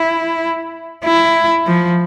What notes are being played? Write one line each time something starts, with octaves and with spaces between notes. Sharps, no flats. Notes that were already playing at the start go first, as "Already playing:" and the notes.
Already playing: E4
E4
F3